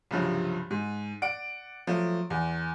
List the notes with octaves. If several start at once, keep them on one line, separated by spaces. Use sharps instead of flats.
C2 G2 C#3 F3 F#3
G#2
D5 F#5 D7
F3 F#3 A3
E2